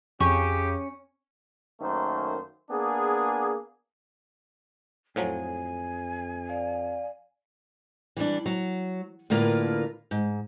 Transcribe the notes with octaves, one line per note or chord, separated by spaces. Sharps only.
F2 C#3 C#4 G4 C#6
F#2 D#3 A3 A#3 C5
A#3 B3 D4 G#4
F2 A2 F3 F#3 G#5
D5 F5
E3 G3 D4
F#3
A2 D3 A#3 F4 A#4 B4
G#2